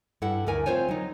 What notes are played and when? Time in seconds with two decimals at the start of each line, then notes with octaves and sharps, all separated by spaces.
0.22 G2 E4 A4 F#5
0.47 D2 A3 A#4 G#5
0.66 C4 F4 C5 C#5 G#5
0.88 F#3 D#4